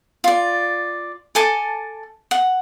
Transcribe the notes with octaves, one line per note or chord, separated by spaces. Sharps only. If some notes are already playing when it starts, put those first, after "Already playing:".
F4 D5
A4 G#5 A5 D6
F#5